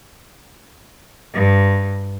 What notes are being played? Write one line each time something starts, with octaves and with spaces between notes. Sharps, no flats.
G2